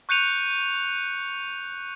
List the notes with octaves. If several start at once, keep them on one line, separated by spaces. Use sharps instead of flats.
C#6 F#6 G6 C#7 D#7 F7